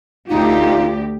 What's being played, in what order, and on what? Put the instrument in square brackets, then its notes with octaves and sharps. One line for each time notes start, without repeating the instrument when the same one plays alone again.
[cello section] D2 G4 [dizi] D#4 [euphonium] F4